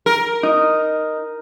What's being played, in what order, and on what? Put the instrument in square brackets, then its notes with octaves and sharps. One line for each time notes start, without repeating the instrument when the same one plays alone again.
[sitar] A#4
[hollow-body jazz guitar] D#4